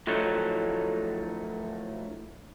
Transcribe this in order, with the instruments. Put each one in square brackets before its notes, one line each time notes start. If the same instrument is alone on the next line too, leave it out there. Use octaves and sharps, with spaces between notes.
[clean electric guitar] A2 D3 F3 F#3 A3 D#4